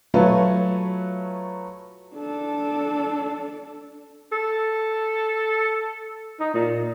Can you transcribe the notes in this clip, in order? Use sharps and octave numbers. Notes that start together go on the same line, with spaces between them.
F#3 A3 F4 B4 C#5
D4 A4
A4
D#4
A#2